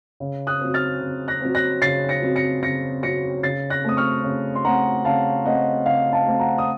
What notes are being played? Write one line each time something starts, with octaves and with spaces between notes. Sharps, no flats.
C#3
D#6 F#6
F#3 C4
F6 A6
C#3
F#6 A#6
F#3 C4
F#6 A#6
C#3 A6 C7
A#6 C#7
F#3 C4
A#6 C#7
C#3 A#6 C#7
F#3 C4 A#6 C#7
C#3 A6 C7
F#6 A#6
A3 C4 D#6
C#6 F6
C#3
C6
A3 C4 F#5 A#5
C#3 F5 A5
A3 C4 D#5 F#5
C#3 F5
F5 A5
A3 C4
F#5 A#5
D#6